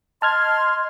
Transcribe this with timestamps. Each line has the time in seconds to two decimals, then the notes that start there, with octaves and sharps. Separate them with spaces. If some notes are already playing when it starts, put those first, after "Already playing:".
0.22 D#5 A5 C6 F6 G#6